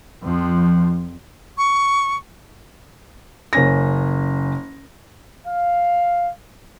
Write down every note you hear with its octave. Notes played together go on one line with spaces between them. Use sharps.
F2 F3
C#6
F#1 C#4 A#6
F5